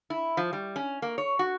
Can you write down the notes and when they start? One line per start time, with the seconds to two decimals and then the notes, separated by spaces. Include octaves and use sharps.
0.10 E4
0.37 F3
0.53 G3
0.76 C#4
1.02 A#3
1.18 C#5
1.39 F#4